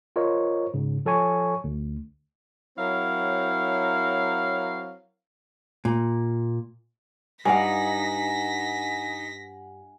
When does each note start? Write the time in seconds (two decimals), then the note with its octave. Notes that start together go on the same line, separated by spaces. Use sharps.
0.16 F4 A#4 C5 C#5 D#5
0.74 G#2 C#3
1.06 F3 A4 C#5 G#5 C#6
1.64 D2
2.77 F#3 C4 E4 A#4 C#5 F5
5.85 A#2
7.45 G2 D#4 D5 F5 F#5 G#5 A#6 B6